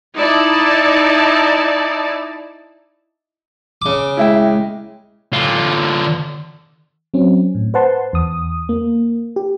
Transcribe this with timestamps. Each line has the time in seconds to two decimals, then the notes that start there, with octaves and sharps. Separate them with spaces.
0.16 D#4 E4 D5 A5
3.82 C#3 D6
4.17 G#3 E4 E5 G5
5.33 D3 F4
7.14 F#3 C4 C#4
7.55 A2
7.74 B4 C5 F#5 A5 C6
8.13 E2 D#6
8.69 A#3
9.36 G4